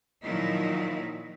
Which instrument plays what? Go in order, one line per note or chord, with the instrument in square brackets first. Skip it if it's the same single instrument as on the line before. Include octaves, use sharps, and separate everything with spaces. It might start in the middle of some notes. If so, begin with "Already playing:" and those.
[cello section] A#2 D#3 F3 F#3 D#4 E4